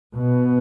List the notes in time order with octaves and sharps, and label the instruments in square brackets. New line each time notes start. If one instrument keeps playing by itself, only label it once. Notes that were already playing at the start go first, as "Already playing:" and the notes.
[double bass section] B2